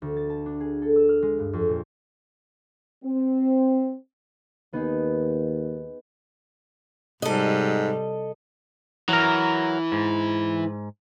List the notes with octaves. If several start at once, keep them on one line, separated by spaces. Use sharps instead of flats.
D2
A6
A5
D4
G#4
A4
E6
F6
G#3
G2
F2
A#2
C4
D#2 B3 D#4 G#4
G#2 C3 G3 A4 D#5
E3 F#3 A#4
G#2